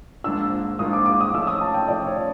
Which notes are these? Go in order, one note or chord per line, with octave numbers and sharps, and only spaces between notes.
G#2 F3 A#3 D4 F4 E6
G#2 F3 A#3 D4 F4 D#6
D6
D6
D#6
F3 A3 C#4 E6
D#6
A5
G5
F3 A3 C#4 D5
C#5